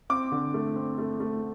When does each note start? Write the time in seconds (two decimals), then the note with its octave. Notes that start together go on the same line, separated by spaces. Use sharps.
0.10 C4 D6
0.32 D3
0.54 A3
0.76 C4
0.98 A3
1.20 A3